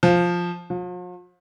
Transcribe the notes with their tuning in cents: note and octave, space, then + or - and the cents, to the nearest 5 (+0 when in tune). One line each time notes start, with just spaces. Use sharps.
F3 +5
F3 +45